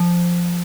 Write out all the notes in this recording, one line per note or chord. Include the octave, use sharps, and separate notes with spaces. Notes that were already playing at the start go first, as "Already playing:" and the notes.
Already playing: F3